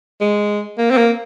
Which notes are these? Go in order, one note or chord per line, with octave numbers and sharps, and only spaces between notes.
G#3
A#3
C4
A#3